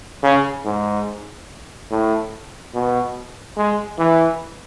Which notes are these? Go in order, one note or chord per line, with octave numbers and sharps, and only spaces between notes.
C#3
G#2
A2
B2
G#3
E3